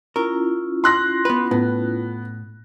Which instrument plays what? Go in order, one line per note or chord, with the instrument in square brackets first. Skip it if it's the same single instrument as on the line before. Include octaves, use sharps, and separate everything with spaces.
[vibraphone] C#4 E4 F4 [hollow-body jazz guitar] A#4
[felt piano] C6 F#6 A#6
[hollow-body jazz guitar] B3 B4
[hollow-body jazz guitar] A2 [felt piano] B3